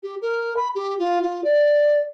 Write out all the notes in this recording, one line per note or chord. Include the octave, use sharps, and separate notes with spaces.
G4
A#4
B5
G4
F4
F4
D5